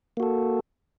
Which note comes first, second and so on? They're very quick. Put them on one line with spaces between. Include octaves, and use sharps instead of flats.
A#3 F#4 A4